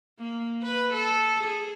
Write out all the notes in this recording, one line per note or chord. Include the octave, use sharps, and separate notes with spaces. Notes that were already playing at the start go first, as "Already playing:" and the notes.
A#3
B4
A4
G#4